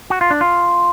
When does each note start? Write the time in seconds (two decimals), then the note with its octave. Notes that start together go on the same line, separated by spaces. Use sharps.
0.10 F#4
0.21 F4
0.31 D4
0.41 F4